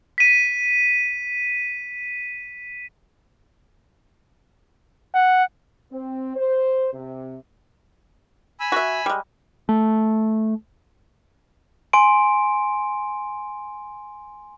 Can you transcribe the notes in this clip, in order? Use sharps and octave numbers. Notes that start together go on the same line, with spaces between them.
B6 D#7
F#5
C4
C5
C3
G#5 B5 E6
F#4 E5
G3 G#3
A3
G#5 C6 D7